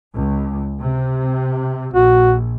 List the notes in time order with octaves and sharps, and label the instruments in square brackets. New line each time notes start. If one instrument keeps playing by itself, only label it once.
[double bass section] C#2
C3
[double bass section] A#1 [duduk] F#4